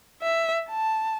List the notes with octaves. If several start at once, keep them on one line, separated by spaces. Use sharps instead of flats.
E5
A5